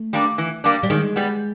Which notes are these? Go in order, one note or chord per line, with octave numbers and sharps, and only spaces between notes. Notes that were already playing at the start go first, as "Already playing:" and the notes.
Already playing: A3
G3 A#3 D4
E3
G3 A#3 D4
G3
D#3 G#3
G3 B3